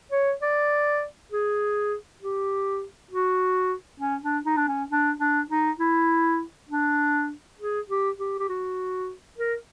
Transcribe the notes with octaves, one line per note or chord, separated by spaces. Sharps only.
C#5
D5
G#4
G4
F#4
C#4
D4
D#4
D4
C#4
D4
D4
D#4
E4
D4
G#4
G4
G4
G4
F#4
A#4